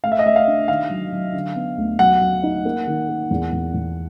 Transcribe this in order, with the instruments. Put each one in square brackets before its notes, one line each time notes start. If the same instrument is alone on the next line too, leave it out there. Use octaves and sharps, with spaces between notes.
[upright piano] A3 [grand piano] F5
[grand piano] E5
D#5
[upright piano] A3 [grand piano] E5
[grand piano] F5
[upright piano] D4
[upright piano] D#3 [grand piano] F5
[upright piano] F#3
F#3
D3
B3
D2
[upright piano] F#3 [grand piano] F#5
[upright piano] F#3
D#4
A#3
D#3
A#3
E2
E2
E2